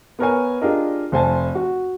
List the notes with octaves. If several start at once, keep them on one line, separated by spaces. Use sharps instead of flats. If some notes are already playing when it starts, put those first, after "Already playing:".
B3 A#4 C#5 G#5
D4 F4 G4 G#4 A#4 D#5
F1 C5 G#5 A5
F#4